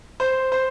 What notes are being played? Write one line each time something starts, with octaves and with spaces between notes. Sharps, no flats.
C5
C5